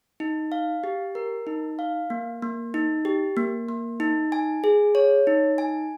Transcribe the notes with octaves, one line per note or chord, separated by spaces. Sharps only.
D#4
F5
G4
A#4
D#4
F5
A#3
A#3
D#4
G4
A#3
A#3
D#4
G#5
G#4
C#5
D#4
G#5